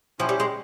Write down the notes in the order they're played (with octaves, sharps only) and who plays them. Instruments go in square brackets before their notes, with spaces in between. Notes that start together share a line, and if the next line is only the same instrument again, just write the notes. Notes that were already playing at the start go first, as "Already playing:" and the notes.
[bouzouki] F3 [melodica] C#4 E4 G4 C5
[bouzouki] G3
G#3